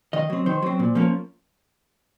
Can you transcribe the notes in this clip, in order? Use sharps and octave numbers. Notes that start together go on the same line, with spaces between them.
D#3 D#5
F#3 C4
D#3 C5
F#3 C4
A#2
F3 A#3 C#4